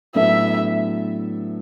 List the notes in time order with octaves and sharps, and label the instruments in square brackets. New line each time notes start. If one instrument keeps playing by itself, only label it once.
[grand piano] A2 F#3 B3 D4 A4 [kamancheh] E5